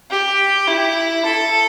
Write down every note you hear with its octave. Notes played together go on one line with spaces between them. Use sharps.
G4
E4
A4